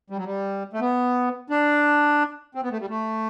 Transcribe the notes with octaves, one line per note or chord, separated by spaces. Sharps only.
G3
F#3
G3
A3
B3
D4
C4
B3
A3
G3
A3